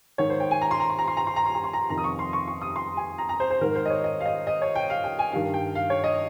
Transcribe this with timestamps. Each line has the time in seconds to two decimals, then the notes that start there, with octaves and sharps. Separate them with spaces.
0.18 G#2 D#3 C#5
0.30 C5
0.40 G5
0.51 G#5
0.61 A#5
0.71 C6
0.80 A#5
0.90 C6
0.99 A#5
1.08 C6
1.17 A#5
1.27 C6
1.36 A#5
1.46 C6
1.55 A#5
1.64 C6
1.73 A#5
1.90 F2 C3 D#3 A#5
1.98 D#6
2.04 C#6
2.19 C6
2.33 C#6
2.47 C#6
2.61 D#6
2.76 C6
2.97 G#5
3.18 A#5
3.29 A#5
3.40 C5
3.50 C5
3.61 G#2 D#3 A#4
3.75 C5
3.85 D#5
3.90 C#5
4.04 D#5
4.20 F5
4.26 D#5
4.47 D#5
4.62 C#5
4.75 G5
4.90 F5
5.04 G5
5.19 G#5
5.33 G2 D#3 F5
5.54 G5
5.75 F5
5.90 C#5
6.04 D#5